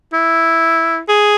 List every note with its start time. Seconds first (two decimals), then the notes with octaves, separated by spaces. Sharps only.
0.13 E4
1.08 G#4